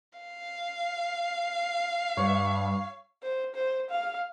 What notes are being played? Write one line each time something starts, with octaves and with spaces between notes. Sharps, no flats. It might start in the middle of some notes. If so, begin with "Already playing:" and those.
F5
G2 C#5
C5
C5
F5